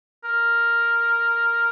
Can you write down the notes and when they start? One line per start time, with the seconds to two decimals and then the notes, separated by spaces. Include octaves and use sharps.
0.24 A#4